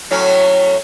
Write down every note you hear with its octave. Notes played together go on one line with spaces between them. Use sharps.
A2 F#3 C#4